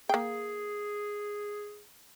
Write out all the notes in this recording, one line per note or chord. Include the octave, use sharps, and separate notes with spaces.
A#3 G#4 G5